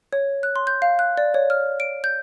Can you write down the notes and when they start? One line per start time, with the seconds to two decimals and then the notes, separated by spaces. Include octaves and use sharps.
0.13 C#5
0.43 F#6
0.56 C6
0.67 G6
0.82 F5
0.99 F#6
1.17 D5
1.34 C#5
1.50 F6
1.80 D7
2.04 G6